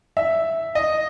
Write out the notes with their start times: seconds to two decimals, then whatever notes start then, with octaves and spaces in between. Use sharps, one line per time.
0.17 E5
0.75 D#5